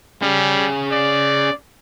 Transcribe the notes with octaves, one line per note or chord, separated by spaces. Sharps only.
G3 C#4 G#4
D5